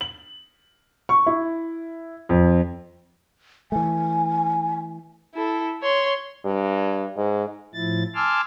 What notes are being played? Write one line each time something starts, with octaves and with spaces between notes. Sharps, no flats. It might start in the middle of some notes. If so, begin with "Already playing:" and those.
F#7
C#6
E4
F2
E3 A3 G#5
E4 A4
C#5 C6
G2
G#2
A2 F3 E4 A6
G#5 A5 C6 D6 E6 F6